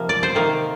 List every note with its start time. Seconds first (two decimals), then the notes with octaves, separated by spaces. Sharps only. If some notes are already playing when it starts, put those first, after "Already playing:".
Already playing: C3 F3 A#3
0.09 D5
0.23 C5
0.35 C3 D#3 A#3